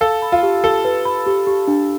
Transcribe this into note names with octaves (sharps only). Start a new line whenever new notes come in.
A4 F5
B5
F4
G4
G4 A4
B4
B5
G4
G4
D4